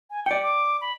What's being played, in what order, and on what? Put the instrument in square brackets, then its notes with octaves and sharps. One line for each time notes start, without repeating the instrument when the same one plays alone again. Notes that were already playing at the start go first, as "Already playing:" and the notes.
[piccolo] G#5
[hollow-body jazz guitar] D5 G5 [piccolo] C#7
[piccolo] D6
B5